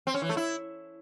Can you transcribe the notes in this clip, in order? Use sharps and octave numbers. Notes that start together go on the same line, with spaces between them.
C4
C#4
E3
A3
E4